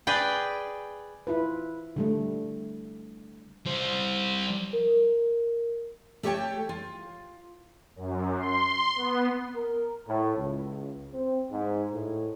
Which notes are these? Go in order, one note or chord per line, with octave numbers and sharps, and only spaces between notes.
G#4 B4 D5 G5
E4 F4 B4
D3 G3 A3
G3 C5
A#4
A3 G4 C5 C#5 G5 A5
F4
F#2
C6
B3
A#4
A2
C#2
C4
G#2
A2